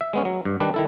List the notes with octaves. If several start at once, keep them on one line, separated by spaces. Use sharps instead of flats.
E5
G#3 B3 C#4
F#3
G2
D#3 G3 D4 B4
D#3 E4 A4